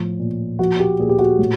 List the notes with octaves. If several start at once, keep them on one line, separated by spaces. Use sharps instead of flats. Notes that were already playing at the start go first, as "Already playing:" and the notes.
Already playing: A2 F3
A#2
F3 F#4
G4
A#2 G#4
G4
F#4
A2